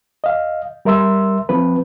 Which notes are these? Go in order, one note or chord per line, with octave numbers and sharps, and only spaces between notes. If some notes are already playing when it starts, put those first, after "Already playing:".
D#5 F5
G3 A#4 E5 C6 E6
F3 C4 B4